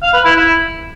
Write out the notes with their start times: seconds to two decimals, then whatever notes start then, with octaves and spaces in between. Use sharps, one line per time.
0.02 F5
0.14 B4
0.25 E4
0.36 E4